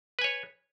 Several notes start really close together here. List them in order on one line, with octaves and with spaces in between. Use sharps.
B4 G#5 C#5